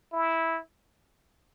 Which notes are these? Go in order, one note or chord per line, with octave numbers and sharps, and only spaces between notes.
E4